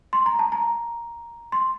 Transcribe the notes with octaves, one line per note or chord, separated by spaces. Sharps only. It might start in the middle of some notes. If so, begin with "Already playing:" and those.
C6
A#5
A5
A#5
C6